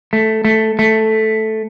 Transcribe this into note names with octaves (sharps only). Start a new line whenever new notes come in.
A3
A3
A3